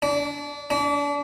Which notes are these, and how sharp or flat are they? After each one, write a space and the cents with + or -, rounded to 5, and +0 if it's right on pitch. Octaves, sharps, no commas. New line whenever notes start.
D4 -30
D4 -35